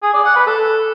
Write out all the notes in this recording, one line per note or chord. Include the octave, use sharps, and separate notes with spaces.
G#4
D5
F#5
B4
A4